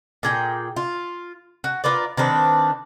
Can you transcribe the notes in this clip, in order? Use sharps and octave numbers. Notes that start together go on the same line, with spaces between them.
A#2 G#4 G5
F4
F#4
F4 A#4 B4 D5
D#3 C4 D4 B4